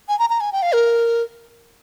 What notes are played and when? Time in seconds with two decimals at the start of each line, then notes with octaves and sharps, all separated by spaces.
0.09 G#5
0.19 A#5
0.30 A#5
0.40 G#5
0.52 G5
0.62 F5
0.74 A#4